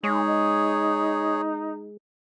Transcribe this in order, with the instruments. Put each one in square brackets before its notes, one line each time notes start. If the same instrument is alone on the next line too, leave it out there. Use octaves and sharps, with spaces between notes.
[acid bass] G#3 [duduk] D#4 [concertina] G#4 C#5